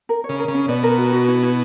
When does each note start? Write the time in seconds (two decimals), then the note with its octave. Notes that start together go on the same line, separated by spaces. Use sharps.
0.09 A#4
0.24 C#5
0.29 C#3
0.39 A#4
0.48 C#3
0.54 C#4
0.68 B2 D5
0.83 A#4
0.98 F#4
1.13 F#4
1.28 E4
1.43 E4